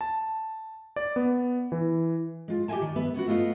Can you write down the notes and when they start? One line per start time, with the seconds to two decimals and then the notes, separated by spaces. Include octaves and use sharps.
0.01 A5
0.96 D5
1.16 B3
1.72 E3
2.48 G#3 F4
2.68 G4 C#5 D#5 E5 G#5 A5
2.82 D#3 D5
2.96 B3 B4 E5
3.14 B3 C#4 E4 F#4
3.27 A3 B3 F4 D#5